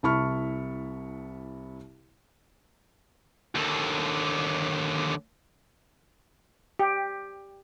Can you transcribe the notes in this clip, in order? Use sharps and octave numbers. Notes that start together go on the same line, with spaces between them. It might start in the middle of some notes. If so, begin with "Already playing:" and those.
C2 E4 A5 B5 C#6 F6
D#2 D3
G4